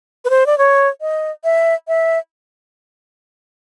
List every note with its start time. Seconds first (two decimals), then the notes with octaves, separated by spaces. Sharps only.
0.25 B4
0.30 C5
0.46 D5
0.58 C#5
1.01 D#5
1.44 E5
1.88 E5